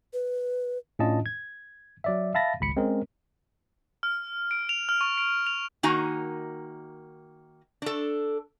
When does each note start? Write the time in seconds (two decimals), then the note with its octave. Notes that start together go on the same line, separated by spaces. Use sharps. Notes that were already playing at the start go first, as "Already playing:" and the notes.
0.13 B4
0.99 A2 C#4 D4 F4 D#5 A5
1.26 G#6
2.04 F#3 D5 E5
2.34 E5 F5 A5 B5 A6 A#6
2.60 G#1 C#2 B5 C#7
2.77 G#3 C4 C#4 A#4
4.03 F6
4.51 D7
4.69 F7
4.89 F6
5.01 C#6
5.18 D7
5.47 F7
5.83 D#3 A#3 D#4 F#4 G#5 A#5
7.82 D4 A4